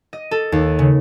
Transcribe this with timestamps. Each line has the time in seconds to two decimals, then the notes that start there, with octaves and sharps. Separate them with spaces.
0.13 D#5
0.31 A4
0.52 D#2
0.79 C#3